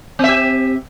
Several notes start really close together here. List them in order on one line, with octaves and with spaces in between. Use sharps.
C4 E5 G4